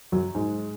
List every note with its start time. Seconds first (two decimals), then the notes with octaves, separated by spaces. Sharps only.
0.12 F#2 F#3
0.35 G#2 G#3